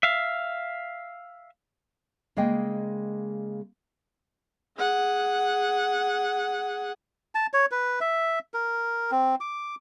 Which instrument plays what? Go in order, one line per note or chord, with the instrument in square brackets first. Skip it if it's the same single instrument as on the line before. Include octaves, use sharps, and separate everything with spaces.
[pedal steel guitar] E5 F5
[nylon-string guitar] C#3 G#3 A#3 D5 D#5 G5
[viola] G#4 F#5
[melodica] A5
C#5
B4
E5
A#4
C4
D6